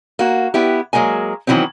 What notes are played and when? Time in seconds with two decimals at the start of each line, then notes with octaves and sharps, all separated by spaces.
0.19 A#3 F#4
0.54 B3 E4 G4
0.93 F#3 G#3 A#3 A#4 G#5
1.47 D#3 E3 F#3 B3 C4